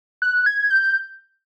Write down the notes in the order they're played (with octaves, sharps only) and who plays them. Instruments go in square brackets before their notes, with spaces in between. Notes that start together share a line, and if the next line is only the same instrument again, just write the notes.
[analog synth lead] F#6
G#6
G6